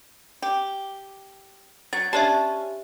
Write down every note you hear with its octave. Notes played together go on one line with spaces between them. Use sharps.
G4
F#3 A6
C#4 D4 G4 C#5 E5 A5